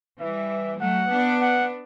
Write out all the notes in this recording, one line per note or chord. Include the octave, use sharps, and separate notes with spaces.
E3 G3 E5
F#3 A3 F#5
B3 D4
F#5